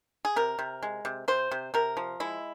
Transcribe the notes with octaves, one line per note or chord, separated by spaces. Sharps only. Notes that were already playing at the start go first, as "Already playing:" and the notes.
G#4
C3 A#4
C3
G#3
C3
C3 C5
C3
C3 A#4
F3
G#3 E4